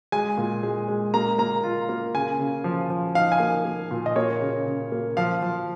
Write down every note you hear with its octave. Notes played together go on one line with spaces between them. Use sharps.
G#3 G#5
A#2
G#3
G#3
A#3 A#5
A#3 A#5
F4
A#3
C#3 G#5
C#3
F3
F3
D#4 F5
G#5
A#3
A#3
A#2
D#5
A#3 C#5
C#3
C#3
A#3
F3 F5
F3